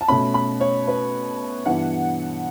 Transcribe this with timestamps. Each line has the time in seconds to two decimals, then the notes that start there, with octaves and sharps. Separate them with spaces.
0.01 A5
0.08 B2 A3 C#4 B5
0.34 B5
0.60 C#5
0.87 B4
1.65 G2 E3 B3 F#5